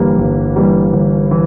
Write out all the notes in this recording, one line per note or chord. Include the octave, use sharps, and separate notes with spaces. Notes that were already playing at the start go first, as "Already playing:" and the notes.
Already playing: G1 G2 E3 G3 A#3
G1
G2 E3 G3 A#3
G1
E3